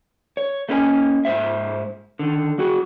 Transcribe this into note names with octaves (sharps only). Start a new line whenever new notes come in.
C#5
A3 A#3 C#4 B4 D#5 G#5
G#2 C5 E5
D3 D#3
F#3 F#4 G#4